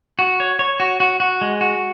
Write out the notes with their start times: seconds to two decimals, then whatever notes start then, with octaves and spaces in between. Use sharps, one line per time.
0.19 F#4
0.40 C#5
0.59 C#5
0.80 F#4
1.00 F#4
1.20 F#4
1.41 G#3
1.61 F#4